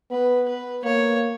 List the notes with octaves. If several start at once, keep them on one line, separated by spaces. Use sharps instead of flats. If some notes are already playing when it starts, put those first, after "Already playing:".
B3 B4
B4
A#3 C#5